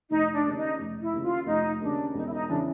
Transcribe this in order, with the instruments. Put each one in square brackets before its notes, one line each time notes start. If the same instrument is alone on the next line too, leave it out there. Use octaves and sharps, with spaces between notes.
[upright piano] F1 [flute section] D#4
[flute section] D4
[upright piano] D#2 C#3
[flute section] D#4
[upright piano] F1
[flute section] E4
[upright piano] D#2 C#3
[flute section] F4
[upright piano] F1 [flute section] D#4
[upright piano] D#2 C#3 [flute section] D4
[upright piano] E1 [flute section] D#4
[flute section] E4
D#4
[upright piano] C#3 E3 [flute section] D4